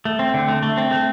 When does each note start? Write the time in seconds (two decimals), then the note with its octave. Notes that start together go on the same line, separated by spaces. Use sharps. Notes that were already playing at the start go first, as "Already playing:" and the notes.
0.05 A3
0.19 C4
0.34 D3
0.49 A3
0.63 A3
0.77 C4
0.91 A3